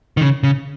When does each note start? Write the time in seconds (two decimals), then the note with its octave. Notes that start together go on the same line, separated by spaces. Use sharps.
0.17 D#3
0.21 C#3
0.43 C#3